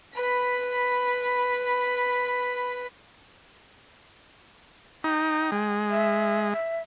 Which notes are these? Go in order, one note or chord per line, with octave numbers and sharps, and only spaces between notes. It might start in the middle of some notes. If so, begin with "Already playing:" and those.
B4 B5
D#4 G5
G#3
E5
E5